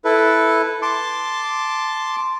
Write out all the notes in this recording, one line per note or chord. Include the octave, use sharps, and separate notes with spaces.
E4 A4 B4
A5 C6 D6